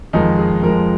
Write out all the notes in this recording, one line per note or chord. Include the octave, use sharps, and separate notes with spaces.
F2 D#3 G#3 D#4
G#4
F2 F3 G#3 A#4